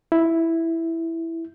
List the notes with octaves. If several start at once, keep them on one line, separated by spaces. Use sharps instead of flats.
E4